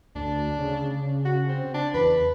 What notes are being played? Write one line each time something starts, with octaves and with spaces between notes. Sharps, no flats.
D2 D4
C#3
F#4
C4
D4
E2 B4